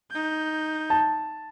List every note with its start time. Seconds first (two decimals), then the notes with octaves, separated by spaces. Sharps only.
0.11 D#4 G6
0.90 A5